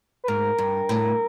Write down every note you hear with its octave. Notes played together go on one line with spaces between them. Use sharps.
B4
G#2 A#4
G2
A2